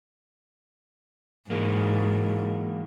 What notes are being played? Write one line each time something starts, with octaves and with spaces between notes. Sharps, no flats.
G#2 E3 G#3 A#3